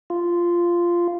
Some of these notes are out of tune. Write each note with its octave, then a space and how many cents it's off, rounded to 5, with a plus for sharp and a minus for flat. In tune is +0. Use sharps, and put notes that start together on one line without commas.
F4 -10